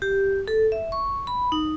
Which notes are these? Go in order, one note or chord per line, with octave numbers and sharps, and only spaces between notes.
G4
A4
E5
C#6
B5
D#4